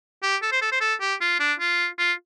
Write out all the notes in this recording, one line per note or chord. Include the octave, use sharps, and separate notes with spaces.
G4
A4
C5
A4
C5
A4
G4
F4
D4
F4
F4